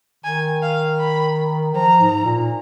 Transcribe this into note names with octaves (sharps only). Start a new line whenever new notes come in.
D#3 G#5
F5
B5
F3 A#5
G#2
A#2